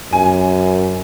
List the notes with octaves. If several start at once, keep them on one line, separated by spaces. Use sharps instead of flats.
F#2 G#5